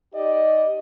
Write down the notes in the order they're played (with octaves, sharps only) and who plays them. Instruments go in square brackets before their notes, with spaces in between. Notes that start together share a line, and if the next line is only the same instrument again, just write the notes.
[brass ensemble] D#4 G4 D5 D#5